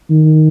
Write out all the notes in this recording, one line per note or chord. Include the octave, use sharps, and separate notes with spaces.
D#3